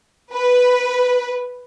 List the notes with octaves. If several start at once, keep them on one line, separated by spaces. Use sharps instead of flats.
B4